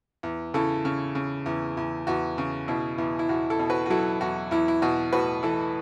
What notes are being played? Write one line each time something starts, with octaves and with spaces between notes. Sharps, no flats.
E2
C#3 E4 A4
C#3
C#3
E2
E2
E2 F#4
C#3
B2 E4
E2
E4
E2 F#4
E4 A4
B2
F#4 B4
F#4
F#3 E4 A4
E2 F#4
E2 E4
E4
B2 F#4
A2 F#4 B4
E3 E4 A4